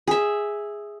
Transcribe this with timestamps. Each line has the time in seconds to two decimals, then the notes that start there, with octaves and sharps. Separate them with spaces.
0.07 G#4 E5